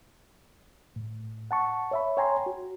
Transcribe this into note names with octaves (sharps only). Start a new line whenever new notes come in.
A2
F#5 A5 C#6
C#5 E5 B5
C#5 G5 G#5 A#5 C6
F#4